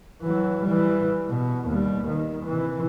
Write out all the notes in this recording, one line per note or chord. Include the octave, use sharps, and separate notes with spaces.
E3 F#3
E3 G3
B2
D#2 G3
D#3
C3 E3